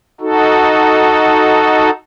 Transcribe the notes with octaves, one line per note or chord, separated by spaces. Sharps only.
D#4 F#4 A4